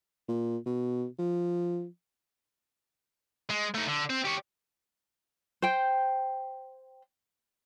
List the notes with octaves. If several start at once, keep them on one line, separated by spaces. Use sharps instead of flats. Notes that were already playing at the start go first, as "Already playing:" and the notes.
A#2
B2
F3
G#3
A3 D#4
D3
C4
G4 C#5
C5 G5